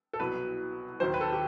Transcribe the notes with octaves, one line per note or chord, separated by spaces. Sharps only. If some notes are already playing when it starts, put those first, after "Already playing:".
A4
C2 B2 F#3 B4
D#2 D#3 F#3 C5
B4
A4
G4